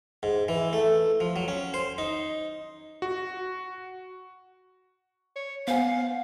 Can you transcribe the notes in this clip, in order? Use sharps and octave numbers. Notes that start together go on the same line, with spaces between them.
G#2
E3
A3
F3
F#3
C#4
C5
D#4
F#4
C#5
B3 C5 F5 F#5 G#5